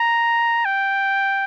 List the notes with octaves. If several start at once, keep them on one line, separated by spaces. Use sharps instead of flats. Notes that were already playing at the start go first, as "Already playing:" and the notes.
Already playing: A#5
G5